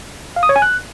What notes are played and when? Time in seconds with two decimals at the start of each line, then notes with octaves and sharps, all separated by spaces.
0.36 F5
0.43 D#6
0.49 C#5
0.56 G#5
0.62 F#6